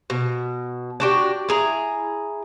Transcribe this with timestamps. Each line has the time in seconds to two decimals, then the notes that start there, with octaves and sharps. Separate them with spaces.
0.10 B2
1.00 D4 F#4 G4
1.49 E4 G#4 A#5